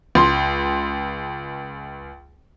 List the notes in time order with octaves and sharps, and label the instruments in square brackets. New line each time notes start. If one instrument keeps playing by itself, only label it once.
[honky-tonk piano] C#2 C6